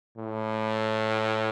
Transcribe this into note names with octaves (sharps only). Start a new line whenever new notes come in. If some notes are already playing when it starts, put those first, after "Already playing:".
A2